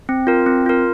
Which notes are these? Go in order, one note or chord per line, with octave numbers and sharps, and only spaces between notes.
C4
F4 A#4
C4
F4 A#4